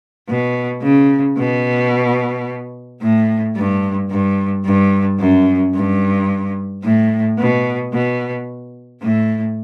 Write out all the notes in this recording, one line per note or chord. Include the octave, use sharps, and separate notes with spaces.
B2
C#3
B2
A2
G2
G2
G2
F#2
G2
A2
B2
B2
A2